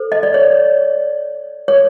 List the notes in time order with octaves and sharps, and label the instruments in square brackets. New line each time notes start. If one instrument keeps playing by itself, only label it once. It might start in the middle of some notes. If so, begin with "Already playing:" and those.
Already playing: [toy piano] A4 C5
D#5
D5
C#5
C#5